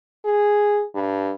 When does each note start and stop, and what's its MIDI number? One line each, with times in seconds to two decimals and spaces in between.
0.25 0.83 68
0.95 1.32 43